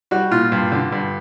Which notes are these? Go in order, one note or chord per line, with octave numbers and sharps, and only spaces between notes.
G3 F#4
A#2 F4
G2
D3
G2